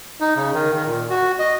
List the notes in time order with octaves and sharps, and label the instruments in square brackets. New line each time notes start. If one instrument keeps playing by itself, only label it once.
[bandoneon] D#4
C#3
D#3
D#3
A#2
F#4
D#5